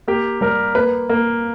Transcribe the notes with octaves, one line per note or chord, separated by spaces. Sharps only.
A#3 G4
G3 A#4
A#3 B4
A#3